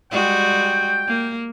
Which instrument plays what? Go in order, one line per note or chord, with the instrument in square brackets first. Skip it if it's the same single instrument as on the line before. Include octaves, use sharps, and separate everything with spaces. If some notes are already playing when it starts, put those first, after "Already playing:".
[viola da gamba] G3 G#3 F#4 [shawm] G5
[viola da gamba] A#3